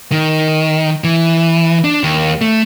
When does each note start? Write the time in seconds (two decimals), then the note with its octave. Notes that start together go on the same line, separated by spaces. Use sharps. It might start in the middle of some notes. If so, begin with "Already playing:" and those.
0.12 D#3
1.04 E3
1.84 D4
2.04 D#2
2.41 A3